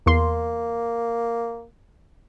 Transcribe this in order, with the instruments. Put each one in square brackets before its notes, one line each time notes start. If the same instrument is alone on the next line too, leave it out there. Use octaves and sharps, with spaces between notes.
[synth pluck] E2 C6 [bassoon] A#3